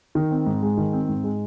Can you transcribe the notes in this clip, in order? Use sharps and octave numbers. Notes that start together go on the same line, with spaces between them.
D#3
C4
G#2
G#3
D#3
C4
G#2
G#3